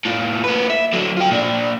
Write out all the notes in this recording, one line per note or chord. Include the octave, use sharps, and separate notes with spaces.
A2 F4
A#3 B4
E5
D3 F#3
F4 G5
A#2 D4